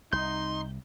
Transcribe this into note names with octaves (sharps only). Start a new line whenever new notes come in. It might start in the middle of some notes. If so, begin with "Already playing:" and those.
C2 C3 D#4 C6 G6